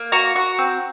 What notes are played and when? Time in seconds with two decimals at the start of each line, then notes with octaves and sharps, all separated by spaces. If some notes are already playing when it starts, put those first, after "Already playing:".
Already playing: A#3
0.12 F#4 A#5
0.36 F#4
0.58 C4